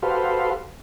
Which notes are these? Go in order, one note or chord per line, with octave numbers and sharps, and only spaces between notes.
F#4 G4 A4 B4 C5 F5